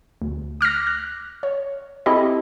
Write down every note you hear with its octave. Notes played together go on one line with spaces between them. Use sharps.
D2
D6 F6 F#6 A#6
F#6
C#5
C4 E4 G4 A4 D#5